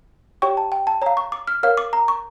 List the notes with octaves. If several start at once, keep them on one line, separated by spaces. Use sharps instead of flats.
G4 C#5 G5 C#6
A5
G5
A5
C#5 F5 A#5
C#6
D6
F6
A#4 C#5 F5 F6
D6
A#5
C#6